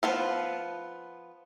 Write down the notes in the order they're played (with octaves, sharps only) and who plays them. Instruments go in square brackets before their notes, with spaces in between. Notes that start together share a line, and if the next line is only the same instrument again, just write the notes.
[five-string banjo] F3 B3 F4